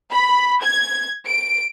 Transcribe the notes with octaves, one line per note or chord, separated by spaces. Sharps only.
B5
G#6
D7